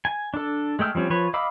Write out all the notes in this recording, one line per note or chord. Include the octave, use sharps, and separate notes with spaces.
G#5
D4 A4
G#3 A3 G5 E6 F6
F3 G3 C4 C#4
F3 B4 C#5
D#5 F5 B5 D6 E6